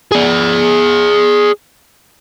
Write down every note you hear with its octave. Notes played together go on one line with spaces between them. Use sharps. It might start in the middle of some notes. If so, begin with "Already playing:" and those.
G#4 D5